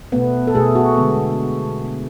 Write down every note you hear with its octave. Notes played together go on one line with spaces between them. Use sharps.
B2 A3 B3
A4
B2 A3 G#4
F#4
D3 G#3 B3